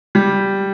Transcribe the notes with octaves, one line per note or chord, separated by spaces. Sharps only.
G3